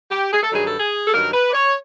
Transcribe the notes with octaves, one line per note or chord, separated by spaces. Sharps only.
G4
G#4
A4
G2 D#3 F#3 G#4
A4
G#4
A4
G2 D#3 F#3 A#4
B4
D5
C#5